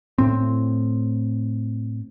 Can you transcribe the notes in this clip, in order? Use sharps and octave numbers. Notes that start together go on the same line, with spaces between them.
A2 C4